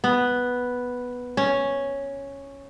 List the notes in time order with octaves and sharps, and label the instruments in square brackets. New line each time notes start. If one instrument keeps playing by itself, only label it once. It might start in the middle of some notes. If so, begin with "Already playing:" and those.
[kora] B3
C#4